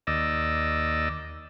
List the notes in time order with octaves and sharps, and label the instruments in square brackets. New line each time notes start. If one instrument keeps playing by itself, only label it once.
[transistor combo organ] D#2 D5 D#5 E6